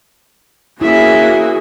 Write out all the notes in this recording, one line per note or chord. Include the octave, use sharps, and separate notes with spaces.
A#3 C#4 E4 F#4 G#4 E5